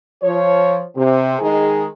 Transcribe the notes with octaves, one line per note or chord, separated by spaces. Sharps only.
F3 C#5
C3
D#3 G#3 D#4 G#4